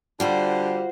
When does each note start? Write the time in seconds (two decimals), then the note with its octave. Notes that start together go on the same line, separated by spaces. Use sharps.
0.20 D3 G3 F4 F#4 C5